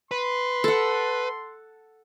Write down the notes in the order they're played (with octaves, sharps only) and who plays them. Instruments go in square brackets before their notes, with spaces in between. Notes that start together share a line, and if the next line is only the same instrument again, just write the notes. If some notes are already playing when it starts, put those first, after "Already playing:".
[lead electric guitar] B4 [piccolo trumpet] C6
[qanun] A4 F#5